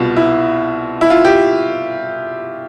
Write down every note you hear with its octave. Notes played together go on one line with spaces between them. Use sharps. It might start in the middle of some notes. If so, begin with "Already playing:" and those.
Already playing: C2 B2 F4
E4
E4
F4
G4